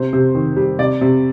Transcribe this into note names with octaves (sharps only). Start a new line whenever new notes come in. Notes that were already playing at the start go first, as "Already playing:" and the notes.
Already playing: C3 C5
C3
D#3
G3
C3 D5
C3